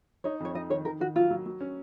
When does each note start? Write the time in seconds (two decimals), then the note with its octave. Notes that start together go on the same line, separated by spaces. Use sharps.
0.24 D#4 C#5
0.40 F2 C#5
0.54 D#4 D#5
0.70 D#3 C#5
0.85 D#3 A#4
1.01 D#3 F#4
1.16 F#3 F4
1.31 F#3
1.46 F#3
1.61 C#4